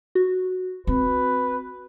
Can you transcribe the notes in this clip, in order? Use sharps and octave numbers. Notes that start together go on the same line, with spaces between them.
F#4
C4 B4